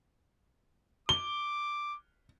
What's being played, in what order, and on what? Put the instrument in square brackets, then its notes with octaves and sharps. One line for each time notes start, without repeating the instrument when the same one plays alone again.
[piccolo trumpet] D6 [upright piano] G7